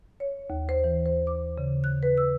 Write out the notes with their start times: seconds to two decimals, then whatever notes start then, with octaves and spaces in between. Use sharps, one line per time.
0.20 C#5
0.50 D#2
0.69 C5
0.84 E3
1.06 C5
1.27 D6
1.58 C#3
1.84 F#6
2.03 B4
2.18 E6